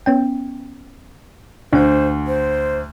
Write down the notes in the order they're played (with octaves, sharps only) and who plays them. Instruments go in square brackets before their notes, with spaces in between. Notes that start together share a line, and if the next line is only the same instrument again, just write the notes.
[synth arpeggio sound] B3 C#4 G5
[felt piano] D2 [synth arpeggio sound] D4 F#5 [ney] C5
[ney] C5